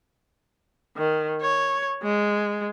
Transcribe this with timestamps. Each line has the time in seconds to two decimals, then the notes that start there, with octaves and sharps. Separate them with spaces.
0.97 D#3
1.41 C#5
2.03 G#3